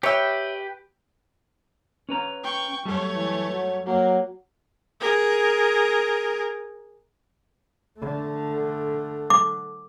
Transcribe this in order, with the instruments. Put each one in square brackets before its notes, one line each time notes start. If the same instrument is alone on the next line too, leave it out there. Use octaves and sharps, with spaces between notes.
[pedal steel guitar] G4 B4 G5 [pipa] C#5 E5
[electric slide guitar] C#4 B4 A#5
[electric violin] G5 C#6
[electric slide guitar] F#2 G3 [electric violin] A3 C#5
[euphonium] E3
F#3
[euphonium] F#3 [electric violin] A#3
[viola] G#4 A#4
[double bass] D3 A3
[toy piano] D6